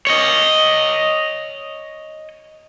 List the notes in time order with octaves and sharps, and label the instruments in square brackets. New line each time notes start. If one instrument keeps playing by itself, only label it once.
[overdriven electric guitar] C#5 D#5